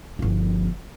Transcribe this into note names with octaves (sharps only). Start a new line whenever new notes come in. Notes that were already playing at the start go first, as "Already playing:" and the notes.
G1 F3